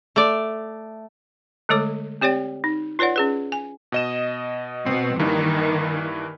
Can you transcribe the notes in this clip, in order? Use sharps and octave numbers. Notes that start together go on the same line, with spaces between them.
A3 D5
D3 G#3 A3 A4 C#5 D6
C4 G4 C#5 D5 G5
D#4
F4 B4 C#5 D5 F#5
C#4 G#4 B4
G#5
B2 D#5 E7
B2 C4
G2 D#3 E3 A#3